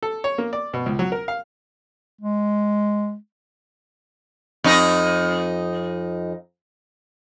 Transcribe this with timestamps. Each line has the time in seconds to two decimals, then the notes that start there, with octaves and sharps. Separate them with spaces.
0.03 A4
0.24 C#5
0.38 A#3
0.53 D5
0.74 B2
0.86 C#2
0.99 F#3
1.12 A#4
1.28 F5
2.21 G#3
4.64 F2 D#4